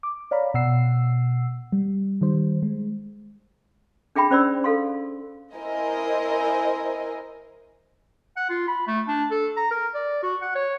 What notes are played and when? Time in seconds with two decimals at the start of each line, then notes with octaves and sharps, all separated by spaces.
0.03 D6
0.31 C#5 D5 F5 A#5 B5
0.54 B2 F#5 E6 C7
1.72 G3
2.21 D#3 G3 C5
2.63 G#3
4.16 D4 G#4 E5 G5 B5
4.31 C#4 C5 D5 B5 E6
4.64 A4 F5 C6
5.55 E4 A#4 C5 D#5 G#5
8.37 F#5
8.49 F4
8.68 B5
8.87 A3
9.08 D4
9.31 A4
9.57 A#5
9.71 A#4
9.94 D5
10.23 F#4
10.42 F#5
10.55 C#5